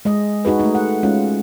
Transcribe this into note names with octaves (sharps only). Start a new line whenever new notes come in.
G#3 D#5
D#4 F#4 G#4 B4
A3 D#4
F#5
G#3 C#4 F4 F#5